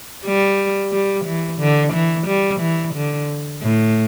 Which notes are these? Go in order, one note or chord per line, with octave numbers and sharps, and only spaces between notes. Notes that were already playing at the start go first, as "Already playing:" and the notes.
G3
G3
E3
D3
E3
G3
E3
D3
A2